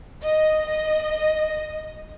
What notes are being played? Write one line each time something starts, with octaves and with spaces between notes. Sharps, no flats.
D#5
D#5